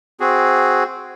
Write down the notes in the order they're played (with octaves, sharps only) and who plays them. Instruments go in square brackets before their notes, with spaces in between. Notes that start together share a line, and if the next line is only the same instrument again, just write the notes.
[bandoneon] C4 F#4 G#4